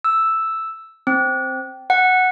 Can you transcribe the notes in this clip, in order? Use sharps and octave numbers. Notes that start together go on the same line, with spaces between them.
E6
C4
F#5